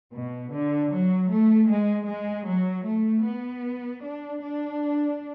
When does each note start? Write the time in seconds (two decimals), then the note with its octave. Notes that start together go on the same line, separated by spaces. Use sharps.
0.14 B2
0.53 D3
0.92 F#3
1.30 A3
1.70 G#3
2.08 G#3
2.48 F#3
2.86 A3
3.25 B3
4.04 D4
4.43 D4